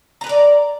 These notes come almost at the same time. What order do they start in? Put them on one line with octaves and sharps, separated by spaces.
A#5 B4 A#4 D5